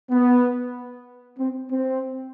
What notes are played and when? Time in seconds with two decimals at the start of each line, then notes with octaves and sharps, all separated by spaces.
0.10 B3
1.39 C4
1.71 C4